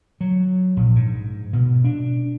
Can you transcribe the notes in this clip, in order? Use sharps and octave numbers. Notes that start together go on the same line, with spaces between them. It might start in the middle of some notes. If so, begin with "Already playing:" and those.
F#3
A#1
G#2
B2
D4